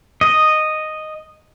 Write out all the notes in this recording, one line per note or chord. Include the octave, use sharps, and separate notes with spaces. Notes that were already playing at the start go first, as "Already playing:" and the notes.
D#5